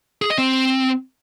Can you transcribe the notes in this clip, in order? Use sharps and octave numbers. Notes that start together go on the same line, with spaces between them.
G#4
D#5
C4